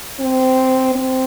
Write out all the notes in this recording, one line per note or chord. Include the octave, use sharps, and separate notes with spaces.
C4
C4